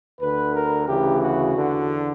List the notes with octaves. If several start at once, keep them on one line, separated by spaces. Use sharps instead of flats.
D2 D3 B4
A#4
D2 C#3 E3 G4
F#4
E2 D3